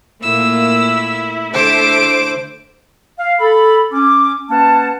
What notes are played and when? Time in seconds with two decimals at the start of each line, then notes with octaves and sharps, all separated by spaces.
0.23 A#2 A3 A#3 E4 E6
1.53 D3 A3 E4 C5 D6 D7
3.20 F5
3.40 A4 B5
3.93 C#4 D6
4.50 A#3 C#4 B4 F#5 A5